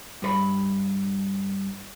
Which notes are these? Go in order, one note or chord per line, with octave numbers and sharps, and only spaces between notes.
G2 B4 B5